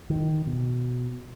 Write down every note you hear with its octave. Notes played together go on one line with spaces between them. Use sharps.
D#3
B2